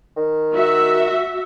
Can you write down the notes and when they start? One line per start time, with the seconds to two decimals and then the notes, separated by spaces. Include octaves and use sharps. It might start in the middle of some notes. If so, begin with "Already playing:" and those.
0.16 D#3
0.53 F#4 E5